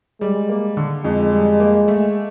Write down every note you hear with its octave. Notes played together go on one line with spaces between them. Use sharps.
G3 G#3
A#3
D3
F2 G#3
G3
A#3
A3